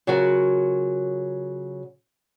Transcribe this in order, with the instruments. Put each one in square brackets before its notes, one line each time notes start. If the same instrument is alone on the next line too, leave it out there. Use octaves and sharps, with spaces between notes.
[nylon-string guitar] C#3 F#3 F4 F#4 A#4